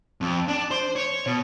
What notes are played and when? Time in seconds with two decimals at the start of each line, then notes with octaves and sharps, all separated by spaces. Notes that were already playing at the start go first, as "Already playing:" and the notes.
0.21 F2
0.48 D4
0.71 C5
0.96 C#5
1.26 B2